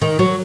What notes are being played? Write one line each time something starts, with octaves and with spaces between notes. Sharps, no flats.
D#3
F#3